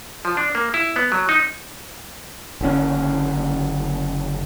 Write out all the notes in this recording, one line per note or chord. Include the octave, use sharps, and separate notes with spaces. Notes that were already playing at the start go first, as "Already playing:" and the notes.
F3
D4
A#3
E4
B3
F#3
D#4
F#1 D3 C#4